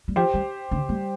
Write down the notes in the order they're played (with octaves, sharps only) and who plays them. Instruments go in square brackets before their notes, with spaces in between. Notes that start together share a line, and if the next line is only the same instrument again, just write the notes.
[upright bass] G3
[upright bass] F3 [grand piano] G4 C5
[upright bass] G3
D3
G3